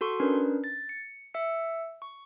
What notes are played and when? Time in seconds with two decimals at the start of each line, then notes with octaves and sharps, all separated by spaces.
0.01 F#4 A4 C6 C#6
0.20 C#4 D4 A#4 B4
0.64 A6
0.89 C#7
1.34 E5 E6 C#7
2.02 C#6